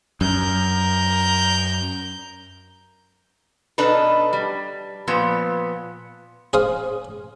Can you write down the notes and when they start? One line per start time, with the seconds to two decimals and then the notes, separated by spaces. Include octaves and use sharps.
0.21 F#2 A#4 G6
3.78 B2 D4 D#4 A4 B4
4.33 G3
5.08 A#2 F3 B3
6.53 G#4 C5 F5 D#6